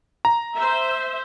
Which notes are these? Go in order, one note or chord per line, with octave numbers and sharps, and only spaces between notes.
A#5
C5 E5